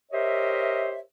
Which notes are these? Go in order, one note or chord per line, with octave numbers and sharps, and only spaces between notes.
G4 A#4 C5 C#5 D#5 E5